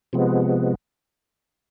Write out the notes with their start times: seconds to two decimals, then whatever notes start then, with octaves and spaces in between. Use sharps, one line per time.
0.13 C3 F3 G#3 B3